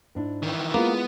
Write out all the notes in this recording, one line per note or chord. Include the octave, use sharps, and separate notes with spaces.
G#2 D4 E4
D#3 E3
G#3 A#3 B3 E4 F4